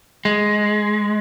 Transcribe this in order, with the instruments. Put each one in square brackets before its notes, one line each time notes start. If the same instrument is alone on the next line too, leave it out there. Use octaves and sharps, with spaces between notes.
[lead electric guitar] G#3